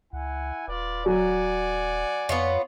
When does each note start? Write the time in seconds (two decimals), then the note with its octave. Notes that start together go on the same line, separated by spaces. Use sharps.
0.13 C#2 E4 F#5 G#5
0.68 D#1 F4 B4 D5
1.06 F#3 D5 F#5 G#5
2.29 F2 B3 F4 C#5